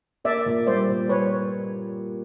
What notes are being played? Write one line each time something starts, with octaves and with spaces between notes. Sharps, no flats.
A#3 D5 E5
A#2
G3 C5 D5
A#2
G3 B4 C#5